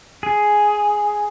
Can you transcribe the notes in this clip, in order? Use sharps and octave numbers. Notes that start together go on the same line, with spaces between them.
G#4